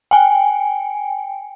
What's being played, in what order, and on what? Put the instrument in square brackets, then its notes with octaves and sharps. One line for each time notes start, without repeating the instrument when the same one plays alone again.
[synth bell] G5 G#5